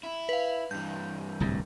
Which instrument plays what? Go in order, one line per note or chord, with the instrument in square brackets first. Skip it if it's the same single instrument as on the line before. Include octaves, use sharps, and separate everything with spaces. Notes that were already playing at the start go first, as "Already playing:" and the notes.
[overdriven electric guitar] E4
[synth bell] B4 F5
[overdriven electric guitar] G2 E3 [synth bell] G6
[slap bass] D1 C2 G#2